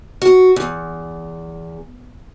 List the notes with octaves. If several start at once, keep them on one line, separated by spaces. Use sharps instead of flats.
F#4
E2